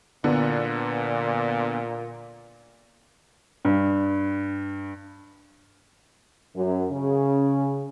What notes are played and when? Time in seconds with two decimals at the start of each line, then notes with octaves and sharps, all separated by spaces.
0.24 A#2 D3 B3
3.65 G2
6.56 F#2
6.91 C#3